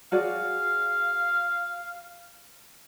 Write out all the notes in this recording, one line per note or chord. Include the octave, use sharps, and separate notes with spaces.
F#4 G#4 D5 F5